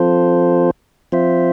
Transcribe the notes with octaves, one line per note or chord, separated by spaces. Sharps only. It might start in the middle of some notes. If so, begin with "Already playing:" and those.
Already playing: F3 C4 F4 A4 C5
F3 C4 F4 C5 E5